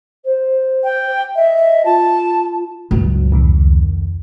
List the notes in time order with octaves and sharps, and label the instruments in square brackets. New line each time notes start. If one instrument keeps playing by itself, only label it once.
[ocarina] C5
[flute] G5
[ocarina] D#5 [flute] E5
[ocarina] F4 [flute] A5
[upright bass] C#2 [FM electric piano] G2 A#2 F#3
[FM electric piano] C2 F2 D#3